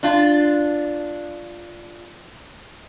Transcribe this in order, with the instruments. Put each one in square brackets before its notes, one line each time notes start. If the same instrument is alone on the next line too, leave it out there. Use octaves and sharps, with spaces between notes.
[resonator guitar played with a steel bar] D4 F4